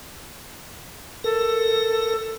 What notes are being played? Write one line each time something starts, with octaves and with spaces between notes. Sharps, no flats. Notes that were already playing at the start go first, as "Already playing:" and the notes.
A4 A#4